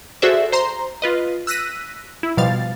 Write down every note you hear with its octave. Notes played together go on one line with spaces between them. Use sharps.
F#4 G#4 A4 C5 D5 E5
C5 A#5 C6
F4 B4 D#5
E6 F#6 A#6 B6 D#7
E4
B2 F3 G3 F5 A6